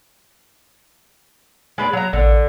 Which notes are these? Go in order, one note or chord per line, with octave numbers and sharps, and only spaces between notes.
G#3 B4 D5
F#3 A#5
A1 D3